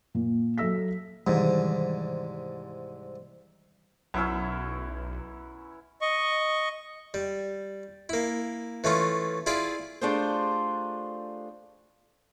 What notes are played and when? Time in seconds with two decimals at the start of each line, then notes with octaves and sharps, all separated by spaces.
0.15 A#2 A#3
0.58 F#3 A4 E5 E6 A#6 B6
1.27 C2 G#2 D#3 E3 G3
4.14 B1 F#2 C#4 E4 B4 E6
6.01 D#5 C#6
7.14 G3
8.09 A#3 E4
8.84 E3 A3 C#4 F4
9.46 E4 F4 G#4 D5
10.01 A3 D4 F4 G4 G#4 C5